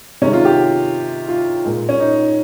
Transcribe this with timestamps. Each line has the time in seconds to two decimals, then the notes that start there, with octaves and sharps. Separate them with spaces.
0.21 C3 D#3 G#3 C#4
0.33 F4
0.45 G4
1.29 F4
1.65 A#2 G#3
1.89 C#4
2.00 D#4